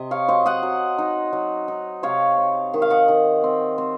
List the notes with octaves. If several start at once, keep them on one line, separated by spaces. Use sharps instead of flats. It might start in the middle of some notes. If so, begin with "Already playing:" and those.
Already playing: C3 D#5
C#5 F5
F#3 C5 D#5
D#5 F#5
F#3
D#4
F#3
D#4
C3 C#5 F5
C4
D#3 F#5
F5
D#5 F#5
D#3
C4
C4